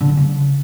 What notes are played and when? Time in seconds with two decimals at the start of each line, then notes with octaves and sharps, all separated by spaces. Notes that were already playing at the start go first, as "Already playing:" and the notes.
0.01 D3
0.09 G3
0.17 C#3